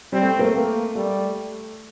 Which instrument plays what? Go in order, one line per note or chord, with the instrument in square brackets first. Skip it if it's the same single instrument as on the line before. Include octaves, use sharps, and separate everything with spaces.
[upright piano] G3 [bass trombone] C4
[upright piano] A3
A#3
A3
[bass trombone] A#3
[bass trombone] G3 [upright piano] A3